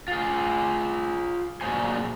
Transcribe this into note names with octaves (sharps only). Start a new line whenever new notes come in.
F4 G#4
A#2 F#3 G3 G#4 C5 G#5